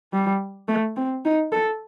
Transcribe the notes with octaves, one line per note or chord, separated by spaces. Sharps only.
G3
A3
C4
D#4
A4